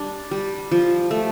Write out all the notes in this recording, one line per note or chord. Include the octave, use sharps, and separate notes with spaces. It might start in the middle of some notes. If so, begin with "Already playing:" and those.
Already playing: G3 D4
G3
F3
A3